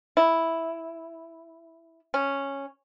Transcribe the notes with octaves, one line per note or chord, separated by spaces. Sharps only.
E4
C#4